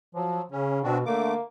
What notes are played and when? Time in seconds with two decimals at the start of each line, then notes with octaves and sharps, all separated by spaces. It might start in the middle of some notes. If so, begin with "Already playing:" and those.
0.15 F3 F#3
0.51 C#3 C#4
0.83 B2 C4 D4 F#4
1.06 D3 A3 A#3 D6